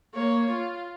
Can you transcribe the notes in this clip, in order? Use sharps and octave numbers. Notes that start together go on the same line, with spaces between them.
A#3 C#5
F4